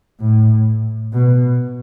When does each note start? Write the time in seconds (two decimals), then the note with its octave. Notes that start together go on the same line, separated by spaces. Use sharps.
0.20 A2
1.13 B2